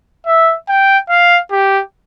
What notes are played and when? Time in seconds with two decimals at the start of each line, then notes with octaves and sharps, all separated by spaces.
0.26 E5
0.69 G5
1.09 F5
1.52 G4